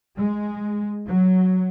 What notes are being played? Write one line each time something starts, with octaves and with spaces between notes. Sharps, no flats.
G#3
F#3